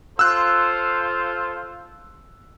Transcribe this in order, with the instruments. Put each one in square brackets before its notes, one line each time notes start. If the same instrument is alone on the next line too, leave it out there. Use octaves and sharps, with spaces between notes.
[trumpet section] F4 A4 C5 [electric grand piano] E6 F#6